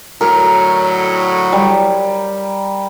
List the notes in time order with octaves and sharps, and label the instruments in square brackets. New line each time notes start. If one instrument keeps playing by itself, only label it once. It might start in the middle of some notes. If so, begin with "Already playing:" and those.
[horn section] A2 D3 F#3 [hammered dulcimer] A#4
[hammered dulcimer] G3